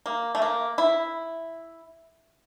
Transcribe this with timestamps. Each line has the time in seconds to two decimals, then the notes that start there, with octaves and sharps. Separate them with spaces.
0.06 A#3
0.35 A3
0.42 A#3
0.78 E4